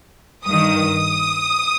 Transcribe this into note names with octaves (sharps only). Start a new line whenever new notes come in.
G2 D#3 D#6